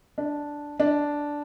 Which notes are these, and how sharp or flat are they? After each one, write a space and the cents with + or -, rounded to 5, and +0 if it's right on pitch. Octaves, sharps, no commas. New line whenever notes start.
D4 -5
D4 -5